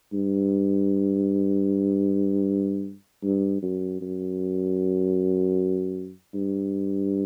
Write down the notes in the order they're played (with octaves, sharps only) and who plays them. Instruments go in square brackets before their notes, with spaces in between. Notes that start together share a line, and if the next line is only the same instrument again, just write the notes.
[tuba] G2
G2
F#2
F#2
G2